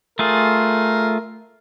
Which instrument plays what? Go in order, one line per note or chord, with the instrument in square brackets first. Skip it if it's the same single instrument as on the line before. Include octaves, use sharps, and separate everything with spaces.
[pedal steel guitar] A3 F4 G#4 [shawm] A#4